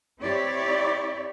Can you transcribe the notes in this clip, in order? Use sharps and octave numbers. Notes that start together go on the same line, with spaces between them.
C4 E4 G4 C#5 D5